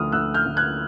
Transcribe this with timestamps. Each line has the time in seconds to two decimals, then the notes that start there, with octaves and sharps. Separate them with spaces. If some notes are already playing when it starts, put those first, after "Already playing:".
Already playing: D2 F3 D#6 F6
0.12 D2 E6 F#6
0.34 F6 G6
0.46 D2
0.57 F#6 G#6